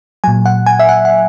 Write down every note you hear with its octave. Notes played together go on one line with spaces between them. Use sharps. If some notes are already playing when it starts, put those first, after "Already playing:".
A#2 F#3 G#5
F#5
G#5
E5
F#5
F#5